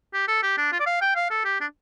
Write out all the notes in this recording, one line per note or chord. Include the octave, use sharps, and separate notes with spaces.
G4
A4
G4
D4
F4
D5
F5
G5
F5
A4
G4
D4